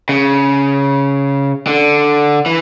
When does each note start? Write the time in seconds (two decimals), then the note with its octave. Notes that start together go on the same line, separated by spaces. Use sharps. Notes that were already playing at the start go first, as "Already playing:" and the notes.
0.09 C#3
1.67 D3
2.46 E3